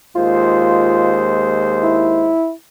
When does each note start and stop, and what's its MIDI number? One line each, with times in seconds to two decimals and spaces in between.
0.16 2.34 39
0.16 2.34 56
0.16 1.30 65
0.16 2.34 72
1.83 2.51 64